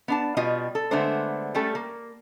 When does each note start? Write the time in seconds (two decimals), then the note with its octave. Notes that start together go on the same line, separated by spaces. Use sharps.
0.08 B3 D4 A5
0.37 B2 G3 F4 D#5
0.75 A4
0.91 D3 G#3 A3 B3 D4 C5
1.55 G3 A3 C#4 A4
1.75 A#3